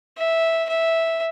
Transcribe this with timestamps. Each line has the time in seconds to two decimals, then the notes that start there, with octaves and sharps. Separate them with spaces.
0.18 E5
0.69 E5